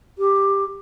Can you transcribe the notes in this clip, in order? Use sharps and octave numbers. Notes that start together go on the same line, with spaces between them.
G4